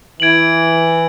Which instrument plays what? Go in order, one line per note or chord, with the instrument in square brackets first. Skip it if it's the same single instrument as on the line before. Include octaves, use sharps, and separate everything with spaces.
[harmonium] E3 [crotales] G#6 D7 F#7